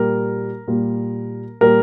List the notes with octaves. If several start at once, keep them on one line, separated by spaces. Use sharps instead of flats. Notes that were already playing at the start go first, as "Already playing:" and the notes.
Already playing: A#2 G3 A#4
A#2 G3
A#2 G3 A#4